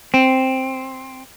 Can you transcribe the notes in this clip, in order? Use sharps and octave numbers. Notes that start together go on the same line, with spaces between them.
C4